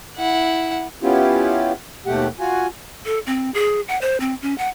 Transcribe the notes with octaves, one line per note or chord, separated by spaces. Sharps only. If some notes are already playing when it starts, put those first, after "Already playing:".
E4 F#5
B3 C#4 E4 F4 G4
D#2 B2 A3 G4 F#5
F4 F#4 G#5
A4
C4
G#4
F#5
C5
C4
C#4
F#5